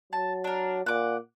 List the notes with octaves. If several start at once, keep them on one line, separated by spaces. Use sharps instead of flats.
F#3 A5
D4 A#4
A#2 F#5 D6